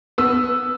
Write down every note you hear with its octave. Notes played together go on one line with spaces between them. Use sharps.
B3 E6